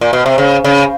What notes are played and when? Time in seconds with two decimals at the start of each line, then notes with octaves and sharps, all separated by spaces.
0.01 A#2
0.13 B2
0.26 C3
0.38 C#3
0.64 C#3